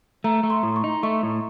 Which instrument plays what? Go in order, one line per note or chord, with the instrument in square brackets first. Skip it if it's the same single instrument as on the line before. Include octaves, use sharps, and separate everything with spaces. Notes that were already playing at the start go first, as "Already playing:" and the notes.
[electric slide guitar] A3 [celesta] A#5
[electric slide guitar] A3
[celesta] C6
[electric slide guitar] A2
[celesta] C#6
[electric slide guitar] D#4
[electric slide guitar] A3 [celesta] C#6
[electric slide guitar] A2